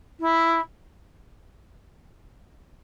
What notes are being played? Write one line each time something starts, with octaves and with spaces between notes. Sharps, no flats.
E4